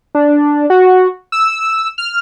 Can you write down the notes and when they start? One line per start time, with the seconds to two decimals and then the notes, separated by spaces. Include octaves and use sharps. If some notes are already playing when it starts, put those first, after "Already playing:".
0.15 D4
0.70 F#4
1.32 E6
1.98 F6